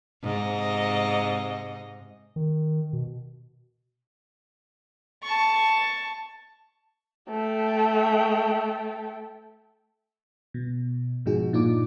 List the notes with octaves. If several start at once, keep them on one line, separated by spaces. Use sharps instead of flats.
G#2 C3 D#5
D#3
B2
A5 C#6
A3 G5
B2
G#2 B2 F3 D#4 F#4 G#4
G2 A#2 D4 D#4 F4 D6